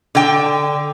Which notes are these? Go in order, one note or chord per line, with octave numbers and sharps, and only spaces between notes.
D3 G5